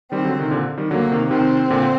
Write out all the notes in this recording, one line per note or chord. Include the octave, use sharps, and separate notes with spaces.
D#3 G3 C4
D3 F#3
C3 D#3
A#2 D3
D#3 G3
D3 F#3 A#3
C3 D#3
C3 D#3 C4
A#2 D3